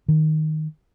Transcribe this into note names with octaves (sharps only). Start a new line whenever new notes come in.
D#3